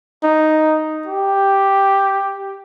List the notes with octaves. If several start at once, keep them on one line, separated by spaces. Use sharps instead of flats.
D#4
G4